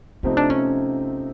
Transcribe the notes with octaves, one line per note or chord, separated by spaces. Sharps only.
C3 F3 A3 C4 C#4 D#4
D4
C#4